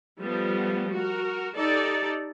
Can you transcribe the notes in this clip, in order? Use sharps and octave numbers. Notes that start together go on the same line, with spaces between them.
F3 G3 A3 B3
F#4 A#4
D#4 G4 A4 D5